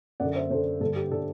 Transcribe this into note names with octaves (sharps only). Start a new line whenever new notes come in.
F#2 D3 D5 F#5
C5 E5
F#2 D3 A4 C5
G2 D3 A4
G4
D3 A4